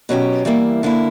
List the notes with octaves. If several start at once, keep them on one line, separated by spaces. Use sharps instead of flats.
B2 F#3 C#4 G4
E3 G3 A#3 E4
D3 A#3 E4